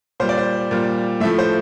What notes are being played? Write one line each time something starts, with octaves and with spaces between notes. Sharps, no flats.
A#2 G3 C5
D5
C5
A#2 G3
A2 F3 A3 E5
C5